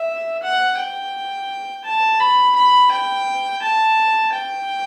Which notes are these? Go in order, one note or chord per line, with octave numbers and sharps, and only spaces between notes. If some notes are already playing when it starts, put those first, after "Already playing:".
Already playing: E5
F#5
G5
A5
B5
B5
G5
A5
G5